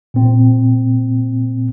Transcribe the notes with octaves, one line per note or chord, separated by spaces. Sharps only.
A#2 C4